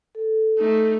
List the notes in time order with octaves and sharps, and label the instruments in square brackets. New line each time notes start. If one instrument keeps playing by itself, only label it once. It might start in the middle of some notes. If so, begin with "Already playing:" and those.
[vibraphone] A4
[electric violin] A3 D#4